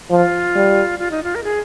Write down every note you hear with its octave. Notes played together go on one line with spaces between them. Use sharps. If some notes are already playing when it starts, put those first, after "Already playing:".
F3 F4
G3
F4
D#4
F4
A#4
G#4